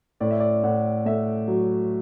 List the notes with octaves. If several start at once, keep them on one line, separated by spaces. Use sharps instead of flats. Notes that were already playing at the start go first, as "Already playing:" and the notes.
A2 D5
E5
D5
A2 F#5
A3 E5
F#3